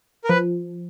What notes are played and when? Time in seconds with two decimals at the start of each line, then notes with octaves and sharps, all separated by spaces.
0.24 A#4
0.29 F3 B4